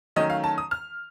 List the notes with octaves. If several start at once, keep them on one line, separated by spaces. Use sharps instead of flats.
D#3 F#3 A3 C#4 D#5
F5
A5
D#6
F6